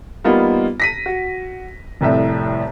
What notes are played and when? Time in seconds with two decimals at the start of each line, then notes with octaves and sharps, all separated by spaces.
0.24 G3 A#3 B3 D#4 F4
0.80 A#6 B6 D#7
1.06 F#4
2.01 F1 C2 A2 E5